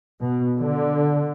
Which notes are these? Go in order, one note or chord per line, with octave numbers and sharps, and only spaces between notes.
B2
D3